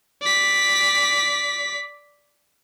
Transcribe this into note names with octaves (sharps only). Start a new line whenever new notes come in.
D5 B6